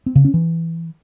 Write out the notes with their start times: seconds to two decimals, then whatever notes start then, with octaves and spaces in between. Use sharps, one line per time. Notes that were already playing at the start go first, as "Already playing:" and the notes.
0.06 C4
0.16 C#3
0.25 C#4
0.34 E3